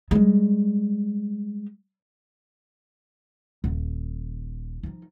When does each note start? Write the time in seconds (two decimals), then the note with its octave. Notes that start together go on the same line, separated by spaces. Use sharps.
0.11 G3 G#3
3.64 D#1
4.83 F3 D#4